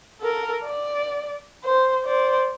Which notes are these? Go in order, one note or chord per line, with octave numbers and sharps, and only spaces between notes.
A4 A#4
D5
C5
C5 D5